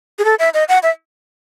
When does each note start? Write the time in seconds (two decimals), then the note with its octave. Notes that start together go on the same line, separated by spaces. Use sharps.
0.19 G#4
0.25 A4
0.39 E5
0.54 D#5
0.68 F#5
0.83 E5